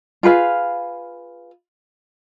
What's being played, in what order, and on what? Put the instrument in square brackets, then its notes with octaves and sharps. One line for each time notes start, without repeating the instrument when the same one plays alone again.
[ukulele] F4 G#4 B4 F5